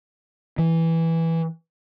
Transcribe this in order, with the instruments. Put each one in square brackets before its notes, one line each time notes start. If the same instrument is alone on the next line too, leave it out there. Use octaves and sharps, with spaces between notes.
[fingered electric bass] E3